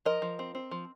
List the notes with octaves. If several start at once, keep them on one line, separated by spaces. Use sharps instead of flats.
F3 A#4 D#5
F3
C4
C4
F3